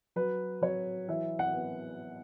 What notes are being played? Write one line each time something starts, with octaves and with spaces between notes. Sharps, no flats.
F#3 B4
F#3 C#5
E3 E5
F#5
B3